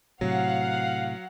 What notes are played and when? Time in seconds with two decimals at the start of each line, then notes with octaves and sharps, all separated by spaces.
0.21 A2 C3 F#3 F5 F#5